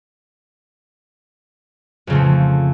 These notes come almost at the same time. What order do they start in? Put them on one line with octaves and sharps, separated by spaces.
F2 C#3 A3 F3